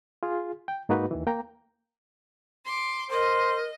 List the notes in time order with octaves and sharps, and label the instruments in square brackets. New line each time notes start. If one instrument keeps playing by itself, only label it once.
[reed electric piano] F4 G#4
G5
G#2 A#3 D#4 F#4 B4
D#2 D#3 E3
A#3 G5 A#5
[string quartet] C6 D6
[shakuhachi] A#4 [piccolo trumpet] C5 [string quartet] D#5